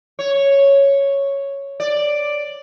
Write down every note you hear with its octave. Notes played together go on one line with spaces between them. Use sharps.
C#5
D5